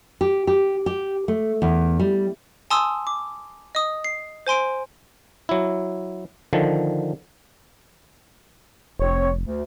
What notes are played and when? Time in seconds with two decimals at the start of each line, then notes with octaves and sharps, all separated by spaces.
0.21 G4
0.47 G4
0.86 G4
1.28 A3
1.62 E2
2.00 G3
2.70 G#5 A5 C6 D#6 E6
3.07 D6
3.75 D#5 D#6
4.04 C7
4.47 C5 G#5 C6 D7
5.49 F#3 E4
6.53 D3 D#3 F3
8.99 F1 C4 C#5
9.45 D2